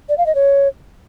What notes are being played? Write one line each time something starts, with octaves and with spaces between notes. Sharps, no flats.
D5
F5
D#5
C#5